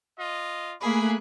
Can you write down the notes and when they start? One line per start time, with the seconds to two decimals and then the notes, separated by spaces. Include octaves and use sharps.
0.18 F4 D#5
0.81 A3 A#3 G#4 G#5 B5 F#6